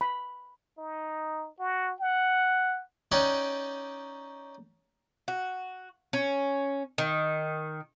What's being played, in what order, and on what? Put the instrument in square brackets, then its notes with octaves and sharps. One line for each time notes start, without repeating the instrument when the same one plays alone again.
[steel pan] B5
[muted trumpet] D#4
F#4
F#5
[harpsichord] C#4 D#4 D5 F#5 G5
[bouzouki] F#4
C#4
D#3